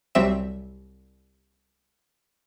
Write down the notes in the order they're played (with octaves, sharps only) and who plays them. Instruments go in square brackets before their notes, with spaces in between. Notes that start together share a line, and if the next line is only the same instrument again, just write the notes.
[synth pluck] C2 F#3 G3 C4 E5 E7